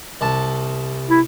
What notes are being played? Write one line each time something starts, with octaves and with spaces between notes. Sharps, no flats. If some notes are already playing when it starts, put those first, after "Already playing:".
C2 A5
E4